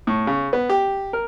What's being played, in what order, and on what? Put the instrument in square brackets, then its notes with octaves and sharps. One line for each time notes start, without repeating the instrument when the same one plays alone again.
[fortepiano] A2
C#3
B3
G4
A#4